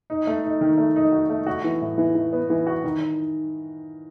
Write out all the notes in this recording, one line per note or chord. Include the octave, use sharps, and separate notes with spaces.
D#4
A3
D#4
D#3
A3
D#4
F#4
A3
F#4
E3
A2
E3
E3
B3
E3
F#4
D#3